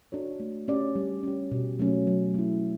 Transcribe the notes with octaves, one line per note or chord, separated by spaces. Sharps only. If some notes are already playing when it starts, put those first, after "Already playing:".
D4 F#4 A4 C#5
A3
C#4 G4 D5
G3
C#4 G4
B2
F#3 A3 C#4
F#3
A3 E4